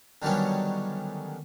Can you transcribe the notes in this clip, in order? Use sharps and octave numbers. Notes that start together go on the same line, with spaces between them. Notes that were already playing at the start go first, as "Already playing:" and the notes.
D3 D#3 F#3 G3 B3 C#4